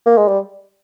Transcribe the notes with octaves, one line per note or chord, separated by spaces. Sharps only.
A#3
G#3
G3